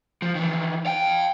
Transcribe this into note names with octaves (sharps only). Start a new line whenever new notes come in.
F3
D#3 E3
F5 G5